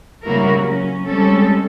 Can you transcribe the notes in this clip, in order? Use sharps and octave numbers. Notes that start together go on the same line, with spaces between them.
C#3 G3 A#3 E4 F#4 A#4
F#3 C#4
G3 G#3 C4 C#4 G4 A4